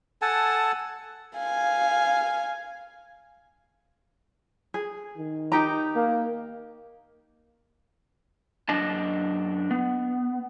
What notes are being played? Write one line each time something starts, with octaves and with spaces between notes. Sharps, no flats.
A4 F#5 G#5 A5
F5 G#5
G#4
D#3
D#4 G4 A#5
A#3
F#2 D4 D#5 A5
B3